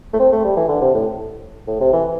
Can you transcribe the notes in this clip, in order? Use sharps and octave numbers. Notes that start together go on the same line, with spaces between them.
A3
C4
A3
G3
E3
D3
C3
A2
A2
C3
E3